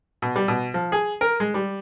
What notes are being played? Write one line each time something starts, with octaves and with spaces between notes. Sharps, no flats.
B2
G3
B2
F3
G#4
A#4
G#3
G3